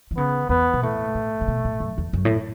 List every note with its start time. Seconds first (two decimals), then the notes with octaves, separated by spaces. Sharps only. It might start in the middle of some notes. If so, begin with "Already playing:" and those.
0.11 E3
0.16 C#3 B3
0.49 E2 B3
0.74 B2
0.83 A2 A3
1.15 A2
1.41 A2
1.48 B2
1.65 A2
1.80 F#2
1.98 E2
2.13 F#2
2.25 A2